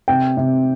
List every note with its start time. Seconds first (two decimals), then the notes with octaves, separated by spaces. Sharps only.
0.08 C3 G5
0.37 C3